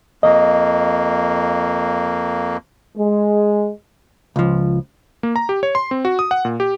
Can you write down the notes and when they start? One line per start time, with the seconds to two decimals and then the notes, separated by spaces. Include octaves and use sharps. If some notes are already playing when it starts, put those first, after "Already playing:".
0.23 F2 A#3 D#5
2.97 G#3
4.36 C#2 F3
5.23 A#3
5.36 A#5
5.49 G4
5.63 C#5
5.75 C6
5.91 C4
6.05 F#4
6.19 D#6
6.31 F#5
6.45 A#2
6.60 G4